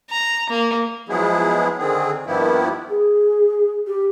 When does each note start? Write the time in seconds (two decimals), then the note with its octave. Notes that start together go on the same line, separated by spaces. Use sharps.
0.10 A#5
0.50 A#3
1.09 F3 F#3 G#3 B3 E4 G#4
1.78 D3 D#3 C4 G#4
2.26 G2 D#3 F3 A#3 B3 E4
2.89 G#4
3.87 G4